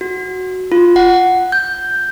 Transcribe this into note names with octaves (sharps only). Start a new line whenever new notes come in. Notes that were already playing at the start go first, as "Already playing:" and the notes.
F#4
F4
F#5
G6